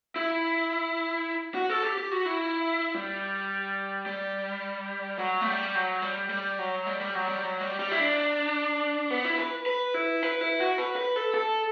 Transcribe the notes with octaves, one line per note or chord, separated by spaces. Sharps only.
E4
F#4
A4
G4
G4
F#4
E4
G3
G3
F#3
A3
G3
F#3
G3
G3
F#3
G3
G3
F#3
G3
F#3
G3
G3
E4
D4
B3
E4
B4
B4
E4
B4
E4
F#4
B4
B4
A4
A4